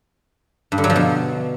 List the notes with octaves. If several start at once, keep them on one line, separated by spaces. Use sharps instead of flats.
G2
D3
F#3
F3
B2